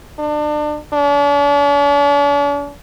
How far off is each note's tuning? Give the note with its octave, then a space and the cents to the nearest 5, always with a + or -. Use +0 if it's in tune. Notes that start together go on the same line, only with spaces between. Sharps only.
D4 +30
D4 -45